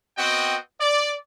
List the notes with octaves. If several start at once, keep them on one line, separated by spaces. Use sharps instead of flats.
B3 C4 F#4 D#5 G5
D5